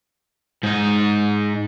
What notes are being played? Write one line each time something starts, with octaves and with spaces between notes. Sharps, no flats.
G#2 D#4